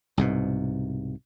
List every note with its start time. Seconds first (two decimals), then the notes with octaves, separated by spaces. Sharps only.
0.17 C2 G#2 B2